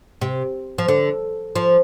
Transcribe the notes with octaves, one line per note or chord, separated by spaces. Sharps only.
C3
F3
D3
F3